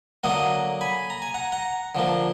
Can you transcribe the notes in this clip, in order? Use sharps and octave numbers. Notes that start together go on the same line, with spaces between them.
D3 F#3 A#3 D#5 F#5
G#5 B5
A#5
G#5
F#5 A#5
F#5 A#5
D3 F3 A#3